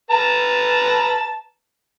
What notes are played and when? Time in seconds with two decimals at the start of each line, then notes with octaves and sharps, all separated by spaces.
0.11 B4 A5 A#5